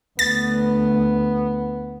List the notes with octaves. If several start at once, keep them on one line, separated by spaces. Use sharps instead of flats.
D2 B3 A6